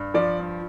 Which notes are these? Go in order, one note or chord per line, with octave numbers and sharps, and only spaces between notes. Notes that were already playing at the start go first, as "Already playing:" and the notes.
Already playing: G2
F3 D5
G2